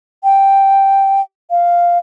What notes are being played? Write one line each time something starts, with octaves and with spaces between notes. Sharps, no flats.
G5
F5